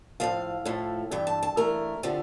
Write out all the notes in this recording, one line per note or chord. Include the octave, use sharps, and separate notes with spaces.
A2 F3 A3 F5
A2 F3 A3
G2 E3 A3 G5
A5
A5
G2 E3 A3 A#4
D3 F3 A3 C4 G4